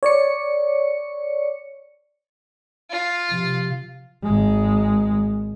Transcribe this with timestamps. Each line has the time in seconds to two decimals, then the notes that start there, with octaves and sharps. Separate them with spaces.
0.03 C#5 D5 C#7
2.91 F4
3.31 C3 F3
4.24 G#1 G#3